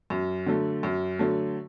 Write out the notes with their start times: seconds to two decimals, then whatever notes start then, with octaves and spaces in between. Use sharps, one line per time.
0.10 F#2
0.46 D3 F#3 A3
0.83 F#2
1.19 D3 F#3 A3